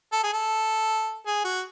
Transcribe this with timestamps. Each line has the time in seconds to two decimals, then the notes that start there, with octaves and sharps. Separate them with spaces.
0.12 A4
0.24 G#4
0.33 A4
1.27 G#4
1.45 F#4